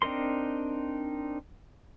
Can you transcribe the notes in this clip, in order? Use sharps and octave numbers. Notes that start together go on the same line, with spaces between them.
C4 D4 D#4 A#4 C6